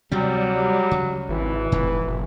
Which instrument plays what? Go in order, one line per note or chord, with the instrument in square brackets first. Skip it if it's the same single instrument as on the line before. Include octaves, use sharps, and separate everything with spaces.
[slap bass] D2 C3 C4 [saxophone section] F#3 [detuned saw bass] G3
[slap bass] D2 C#3
[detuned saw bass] G#1 [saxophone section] E3
[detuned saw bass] F1 [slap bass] A2 C3 F3
[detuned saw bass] F#1